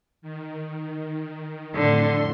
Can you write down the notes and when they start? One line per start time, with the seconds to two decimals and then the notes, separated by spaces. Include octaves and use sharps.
0.22 D#3
1.75 F2 A2 D3 C6